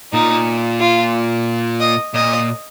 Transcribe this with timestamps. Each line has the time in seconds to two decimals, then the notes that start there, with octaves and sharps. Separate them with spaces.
0.13 A#2 D#4
0.80 F4
1.81 D#5
2.14 A#2 D#5